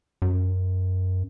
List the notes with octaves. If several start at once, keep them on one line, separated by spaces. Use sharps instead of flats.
F#2